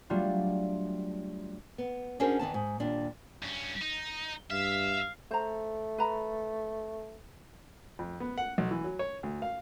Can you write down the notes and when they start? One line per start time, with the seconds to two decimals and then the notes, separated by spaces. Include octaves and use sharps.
0.10 F#3 G3 A3 D4 F4
1.78 B3
2.20 C#4 D4 F#4 G#4 A#4 C5
2.39 E2 D#3 B3 A5
2.54 G#2
2.80 D#2 A#2 G3 D4
3.43 G2 C#4
3.82 D#4
4.51 G2 E5 F5
5.31 A3 C5 A#5
5.98 B4 A#5 B5
7.99 F2
8.20 B3
8.38 F#5
8.58 B1
8.71 E3
8.84 F#3
8.99 C#5
9.23 D2
9.42 F5